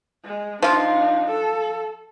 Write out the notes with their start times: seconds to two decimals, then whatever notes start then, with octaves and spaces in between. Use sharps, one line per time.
0.24 G#3
0.63 F3 D4 D#4 F4
1.30 A4